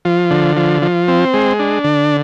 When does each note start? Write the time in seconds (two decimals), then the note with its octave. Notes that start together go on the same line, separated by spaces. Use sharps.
0.05 F3
0.31 D3
0.57 F3
0.82 F3
1.08 C4
1.34 G#3
1.59 D4
1.84 D3